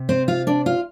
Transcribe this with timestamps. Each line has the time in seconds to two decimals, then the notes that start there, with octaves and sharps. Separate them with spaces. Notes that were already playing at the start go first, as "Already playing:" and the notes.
Already playing: C3
0.09 C4 C5
0.28 F4 F5
0.47 D4 D5
0.66 F4 F5